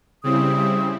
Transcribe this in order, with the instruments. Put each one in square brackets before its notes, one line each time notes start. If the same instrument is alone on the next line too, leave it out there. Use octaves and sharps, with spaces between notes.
[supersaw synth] C#3 C4 [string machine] G3 E4 [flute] D#6